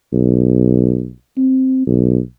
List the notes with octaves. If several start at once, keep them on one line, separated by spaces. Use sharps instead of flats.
B1
C4
B1